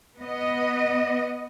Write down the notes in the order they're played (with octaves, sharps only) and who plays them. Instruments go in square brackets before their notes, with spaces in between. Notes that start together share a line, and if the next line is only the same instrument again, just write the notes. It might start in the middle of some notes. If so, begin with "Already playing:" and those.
[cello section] B3 D#5